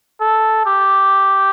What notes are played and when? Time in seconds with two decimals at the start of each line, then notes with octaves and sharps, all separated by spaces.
0.21 A4
0.66 G4